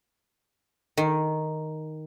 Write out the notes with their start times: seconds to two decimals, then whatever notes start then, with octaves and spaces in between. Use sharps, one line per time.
0.97 D#3